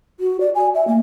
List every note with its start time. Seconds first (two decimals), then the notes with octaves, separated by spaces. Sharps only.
0.20 F#4
0.40 D5
0.55 G#5
0.75 E5
0.88 A#3